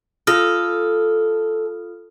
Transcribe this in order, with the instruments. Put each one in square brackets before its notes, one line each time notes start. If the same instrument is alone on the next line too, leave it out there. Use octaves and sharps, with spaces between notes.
[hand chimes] F4 D#6 F6 [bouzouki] A4